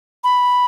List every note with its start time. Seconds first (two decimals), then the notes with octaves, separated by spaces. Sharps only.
0.24 B5